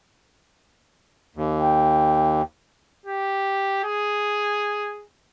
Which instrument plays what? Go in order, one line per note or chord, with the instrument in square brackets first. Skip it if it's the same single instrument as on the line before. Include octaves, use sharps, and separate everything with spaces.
[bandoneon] D#2
[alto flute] G5
[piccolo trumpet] G4
G#4